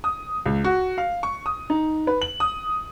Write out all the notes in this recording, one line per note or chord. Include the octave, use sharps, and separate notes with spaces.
D#6
C#2
F#4
F5
C#6
D#6
D#4
B4
F#7
D#6